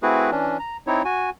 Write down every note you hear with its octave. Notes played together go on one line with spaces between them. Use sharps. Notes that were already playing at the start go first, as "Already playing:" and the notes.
A3 C4 E4 F#4 G#4 B4
E3 C#4 D4
A#5
C4 D#4 E4 C#5
F#4 G#5